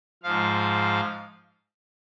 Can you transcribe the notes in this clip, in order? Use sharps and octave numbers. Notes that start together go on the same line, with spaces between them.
G#2 F3 F5